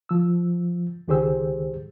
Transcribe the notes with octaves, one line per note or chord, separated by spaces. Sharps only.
F3 E6
C#2 D#3 G4 G#4 C5 E6